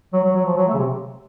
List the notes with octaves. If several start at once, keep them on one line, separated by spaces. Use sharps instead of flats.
F#3
F#3
F#3
F3
F#3
A3
C#3
C3